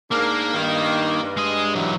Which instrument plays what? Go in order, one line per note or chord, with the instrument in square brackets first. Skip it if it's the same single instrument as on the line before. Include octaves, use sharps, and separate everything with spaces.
[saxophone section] G#2 D4 A#4 [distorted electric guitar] A#3
[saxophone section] G2 D#3
G2
[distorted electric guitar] G#3 D#5
E3 F#3